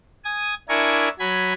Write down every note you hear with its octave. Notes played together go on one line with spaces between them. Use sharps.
G#5 D#6
D4 E4 A#4 G#5 C#6
F#3 G#5 B5